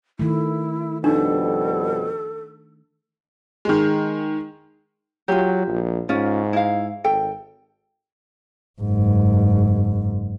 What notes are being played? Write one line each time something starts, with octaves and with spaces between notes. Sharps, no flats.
D#3 A3 E4
F2 B2 G3 D4 D#4 A4
D#3 G#3
F#3 F4 G4
A#1
G#2 C#4 F4
E4 F5
G#1 A4 G5
F#1 G#2